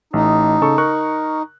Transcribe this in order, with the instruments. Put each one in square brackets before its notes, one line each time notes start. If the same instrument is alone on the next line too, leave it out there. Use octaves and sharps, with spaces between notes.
[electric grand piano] A1 A3 [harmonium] D#4
[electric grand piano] C#3 A4 C#6
A#4 C#6 F#6